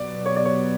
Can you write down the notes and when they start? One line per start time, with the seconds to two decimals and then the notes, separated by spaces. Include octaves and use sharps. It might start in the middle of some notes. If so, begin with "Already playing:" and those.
Already playing: B2 F#3 B3 D5
0.26 C#5
0.36 D5
0.45 C#5